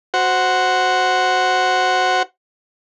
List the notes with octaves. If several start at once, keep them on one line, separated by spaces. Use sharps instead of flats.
F#4 C5 F#5